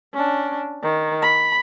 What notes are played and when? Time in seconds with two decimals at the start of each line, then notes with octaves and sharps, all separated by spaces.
0.14 C#4 D4
0.83 D#3
1.22 B5